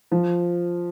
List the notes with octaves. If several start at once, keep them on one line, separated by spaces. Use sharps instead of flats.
F3